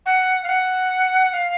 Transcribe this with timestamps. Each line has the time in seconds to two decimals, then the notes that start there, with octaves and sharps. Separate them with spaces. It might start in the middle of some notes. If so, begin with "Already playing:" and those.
0.06 F#5
0.44 F5
0.49 F#5
1.33 F5